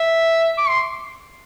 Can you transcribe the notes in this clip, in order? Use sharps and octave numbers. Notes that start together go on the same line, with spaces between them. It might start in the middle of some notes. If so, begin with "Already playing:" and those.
Already playing: E5
D6
C6